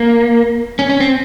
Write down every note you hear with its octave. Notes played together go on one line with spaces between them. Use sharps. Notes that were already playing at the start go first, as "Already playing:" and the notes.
Already playing: A#3
C#4
C#4
C4